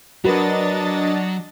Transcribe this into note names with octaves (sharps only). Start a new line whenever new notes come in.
F#3 D4 F#4 A#4 B4 D#5 A6